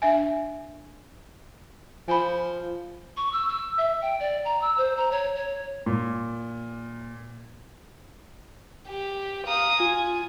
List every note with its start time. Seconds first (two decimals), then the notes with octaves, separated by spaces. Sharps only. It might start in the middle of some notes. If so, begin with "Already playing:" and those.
0.02 D4 E5 G#5
2.08 F3 G#5 B5
3.17 C#6
3.33 E6
3.48 E6
3.78 E5
4.02 G5
4.20 D5
4.45 A#5
4.62 E6
4.78 C5
4.97 A#5
5.11 C#5
5.36 C#5
5.86 A#2
8.88 G4
9.47 F5 A#5 D#6
9.80 F4 G#5